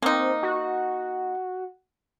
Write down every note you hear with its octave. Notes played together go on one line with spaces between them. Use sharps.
A#3 C4 D#4
F#4